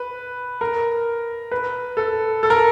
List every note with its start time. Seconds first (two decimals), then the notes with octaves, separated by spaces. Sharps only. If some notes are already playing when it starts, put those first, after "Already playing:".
Already playing: B4
0.61 A#4
1.51 B4
1.97 A4
2.43 A4
2.50 A#4